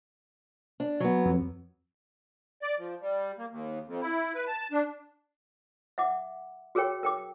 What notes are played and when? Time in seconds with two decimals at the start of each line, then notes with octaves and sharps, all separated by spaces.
0.80 D4
1.00 F#3 B3
1.26 F2
2.62 D5
2.79 F3
3.02 G3
3.38 A#3
3.50 D#2
3.86 F2
4.01 E4
4.35 B4
4.47 A5
4.72 D4
5.98 E5 F#5 D6
6.75 F#4 G#4 A#4 C#5 G5
7.03 A#4 G5 D6